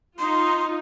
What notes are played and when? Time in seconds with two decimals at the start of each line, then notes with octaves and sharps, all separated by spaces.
0.19 D#4 F4 C6